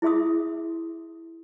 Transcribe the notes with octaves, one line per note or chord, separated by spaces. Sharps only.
E4 G#4 E5 C6 D#6